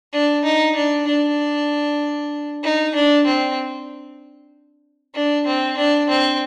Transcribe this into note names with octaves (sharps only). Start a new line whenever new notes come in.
D4
D#4
D4
D4
D#4
D4
C4
D4
C4
D4
C4